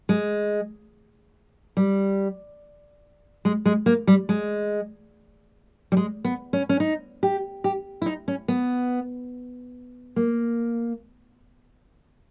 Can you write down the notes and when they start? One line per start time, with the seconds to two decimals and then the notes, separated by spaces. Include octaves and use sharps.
0.09 G#3
1.77 G3
3.45 G#3
3.66 G#3
3.86 A#3
4.07 G3
4.29 G#3
5.92 G3
5.97 G#3
6.25 B3
6.53 C#4
6.69 C#4
6.80 D#4
7.23 G4
7.64 G4
8.02 E4
8.06 D#4
8.28 C#4
8.48 B3
10.16 A#3